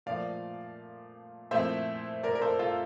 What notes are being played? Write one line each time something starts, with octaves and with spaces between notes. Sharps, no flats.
A#2 F3 A3 D5 F5
A#2 F3 A3 C4 E4 C5 E5
A#4 D5
A#4
A4 C5
F4 A4